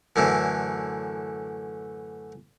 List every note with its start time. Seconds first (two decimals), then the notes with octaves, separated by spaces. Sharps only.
0.16 F#2 A2 D3 E3